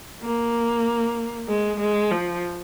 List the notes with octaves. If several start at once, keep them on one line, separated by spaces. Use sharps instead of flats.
A#3
G#3
G#3
F3